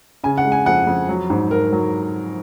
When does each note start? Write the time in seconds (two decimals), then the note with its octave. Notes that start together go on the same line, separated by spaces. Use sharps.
0.24 C#3 G#5
0.38 F#5
0.45 G#3
0.52 G#5
0.66 F2 F#5
0.87 F2
1.09 F#3
1.30 G#2
1.51 G#2 A#4
1.72 F#3